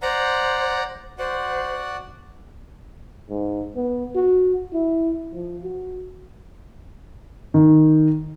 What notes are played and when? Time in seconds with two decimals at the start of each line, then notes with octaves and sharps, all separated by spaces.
0.02 C5 D5 F#5 A#5
1.19 F#4 C5 D5 F#5
3.30 G#2
3.76 B3
4.15 F#4
4.73 E4
5.34 F3
5.63 F#4
7.54 D#3